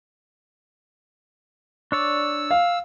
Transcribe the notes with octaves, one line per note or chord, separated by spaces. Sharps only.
D4 C#5 D5 E6
F5